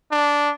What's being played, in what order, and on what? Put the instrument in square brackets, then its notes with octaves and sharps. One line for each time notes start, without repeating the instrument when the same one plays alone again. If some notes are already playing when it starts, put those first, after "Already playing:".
[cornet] D4